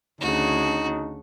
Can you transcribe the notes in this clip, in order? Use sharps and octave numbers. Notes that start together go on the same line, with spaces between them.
D2 C#3 D4 D#4 F#4